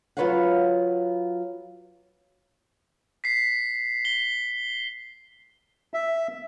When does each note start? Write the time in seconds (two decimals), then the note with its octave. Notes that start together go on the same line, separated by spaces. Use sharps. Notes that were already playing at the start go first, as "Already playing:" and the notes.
0.17 F#3 F4 B4 C#5 F5 F#5
3.24 B6 C7
4.05 G7
5.94 E5